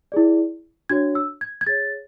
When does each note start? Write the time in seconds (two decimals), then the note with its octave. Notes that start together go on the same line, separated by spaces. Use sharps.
0.12 E4 G#4 D5
0.89 D4 F#4 C#5 G#6
1.15 E6
1.41 G#6
1.61 G#6
1.67 G#4 C#5 A6